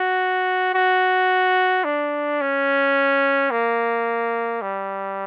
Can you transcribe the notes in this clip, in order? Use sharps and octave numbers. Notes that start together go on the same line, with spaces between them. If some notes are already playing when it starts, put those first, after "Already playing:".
Already playing: F#4
F#4
D4
C#4
A#3
G3